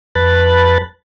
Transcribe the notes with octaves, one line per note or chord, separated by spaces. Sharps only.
F2 B4 A5 B5 F#6 A6